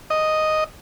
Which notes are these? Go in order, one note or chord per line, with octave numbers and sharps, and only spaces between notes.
D#5